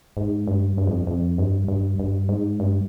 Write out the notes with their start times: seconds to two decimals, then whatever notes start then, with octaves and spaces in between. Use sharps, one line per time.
0.17 G#2
0.47 G2
0.77 G2
0.87 F2
1.07 F2
1.38 G2
1.68 G2
1.99 G2
2.29 G#2
2.60 G2